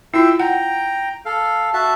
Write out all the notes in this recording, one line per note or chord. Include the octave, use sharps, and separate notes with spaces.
E4 F4 E5 G5 E6
F#5 G5 A#5
A4 F5
F#4 E5 A5